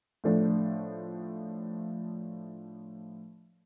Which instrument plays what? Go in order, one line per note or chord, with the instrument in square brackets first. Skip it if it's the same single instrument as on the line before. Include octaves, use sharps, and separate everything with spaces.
[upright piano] A2 F3 A3 D4